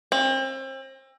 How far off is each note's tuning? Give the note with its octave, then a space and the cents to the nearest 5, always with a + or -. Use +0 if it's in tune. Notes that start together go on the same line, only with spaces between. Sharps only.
C4 +35